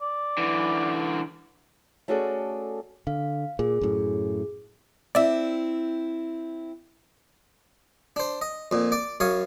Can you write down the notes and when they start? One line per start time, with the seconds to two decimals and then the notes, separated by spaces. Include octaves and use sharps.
0.01 D5
0.38 D3 E3
2.08 A3 C#4 F#4 G#4 A4 D5
3.07 D3 F5
3.59 A#2 G#4
3.81 F#2 A2
5.15 C4 E4 D5 E5
8.16 D4 C5
8.41 D#5
8.71 F2 A#2
8.92 D5 D6
9.20 F#2 C#5 F5 D#6